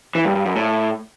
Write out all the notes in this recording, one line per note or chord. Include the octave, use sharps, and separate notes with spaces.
E3
G2
G2
F#2
A2